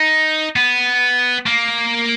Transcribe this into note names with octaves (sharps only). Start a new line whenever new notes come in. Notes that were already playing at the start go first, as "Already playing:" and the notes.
Already playing: D#4
B3
A#3